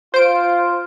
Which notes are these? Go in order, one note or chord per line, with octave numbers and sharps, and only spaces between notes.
F4 C5 D7